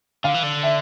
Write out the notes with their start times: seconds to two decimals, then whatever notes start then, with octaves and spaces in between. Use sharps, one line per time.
0.24 D3 F5
0.34 E3
0.43 D3
0.63 E5